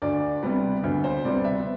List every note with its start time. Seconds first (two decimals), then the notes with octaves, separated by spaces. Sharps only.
0.02 D2 D5
0.43 C3 G3 B3
0.84 D2
1.04 C5
1.24 C3 G3 B3 D5
1.45 E5